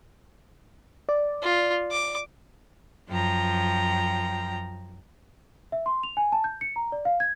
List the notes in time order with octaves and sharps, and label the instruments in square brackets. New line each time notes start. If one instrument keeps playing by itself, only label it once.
[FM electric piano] D5
[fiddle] F4
D6
[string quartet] F#2 F3 G5 A#5
[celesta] E5
C6
F7
G#5
A5
G6
C#7
A#5
D5
F5
G#6